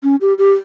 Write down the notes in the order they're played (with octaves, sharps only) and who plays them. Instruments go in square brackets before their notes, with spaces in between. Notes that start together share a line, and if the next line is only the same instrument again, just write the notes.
[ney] C#4
G4
G4